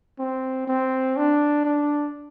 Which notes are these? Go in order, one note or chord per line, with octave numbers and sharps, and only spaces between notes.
C4
C4
D4
D4